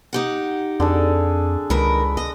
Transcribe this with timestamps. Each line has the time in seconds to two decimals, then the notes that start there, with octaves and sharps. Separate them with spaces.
0.13 D#4 G4 F#5
0.80 F2 D3 G#4 A4
1.70 C#2 D#3 A#4 B4
2.17 D#5